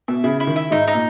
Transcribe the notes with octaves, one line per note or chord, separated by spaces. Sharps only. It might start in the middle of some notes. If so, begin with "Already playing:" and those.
B2 E5
C#3 E4
E4
D#3
E5
G#2 D#4
D#4
A#2